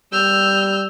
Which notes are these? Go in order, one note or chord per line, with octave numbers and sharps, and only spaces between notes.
G3 E6 F6 G6